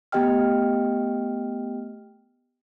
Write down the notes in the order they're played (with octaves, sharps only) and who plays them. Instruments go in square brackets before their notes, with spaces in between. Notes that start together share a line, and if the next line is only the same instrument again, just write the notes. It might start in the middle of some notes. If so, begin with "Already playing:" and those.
[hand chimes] A3 B3 G4 D#5 G5 F6